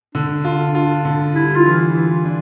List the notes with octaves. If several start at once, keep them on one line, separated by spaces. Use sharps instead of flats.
D3 D4
F4
F4
D3
G3 E4
F4
E3
E3
D4